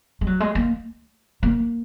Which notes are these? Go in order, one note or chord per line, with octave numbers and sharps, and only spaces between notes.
G#3
F#3
G#3
A#3
A#3